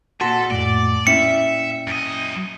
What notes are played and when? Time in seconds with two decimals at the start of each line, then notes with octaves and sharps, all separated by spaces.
0.21 A#2 F#4 A4 A5 C6 B6
0.50 F2 A2 A3 D5
1.07 A#2 C#4 E4 E5 G5 C#7
1.87 F#2 D#5